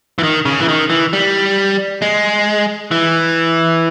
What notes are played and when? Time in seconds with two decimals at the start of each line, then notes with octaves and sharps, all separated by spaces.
0.18 E3
0.23 D#3
0.45 C#3
0.60 E3
0.68 D#3
0.90 E3
1.13 G3
2.02 G#3
2.91 E3